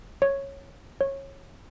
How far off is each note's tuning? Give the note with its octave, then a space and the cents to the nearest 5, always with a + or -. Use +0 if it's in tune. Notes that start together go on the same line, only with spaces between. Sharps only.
C#5 -10
C#5 -20